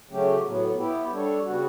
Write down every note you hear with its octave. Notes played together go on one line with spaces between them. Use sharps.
C#3 F#3 A3 C#4 G4
A2 F#3 B3
B3 E4 G4
G3 D4 A4 C#5
C#3 G3 B3 F#4